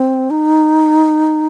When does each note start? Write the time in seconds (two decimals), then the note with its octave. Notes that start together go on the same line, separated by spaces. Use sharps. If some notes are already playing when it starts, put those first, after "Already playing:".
Already playing: C4
0.30 D#4